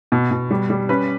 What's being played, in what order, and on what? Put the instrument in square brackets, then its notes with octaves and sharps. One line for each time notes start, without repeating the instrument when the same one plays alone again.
[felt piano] B2
B2
G3
G3
C#4 B4